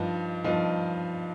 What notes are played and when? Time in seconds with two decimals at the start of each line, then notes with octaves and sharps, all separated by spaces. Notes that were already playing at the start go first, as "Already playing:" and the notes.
Already playing: G2 F3 D#4
0.44 G2 F3 D#4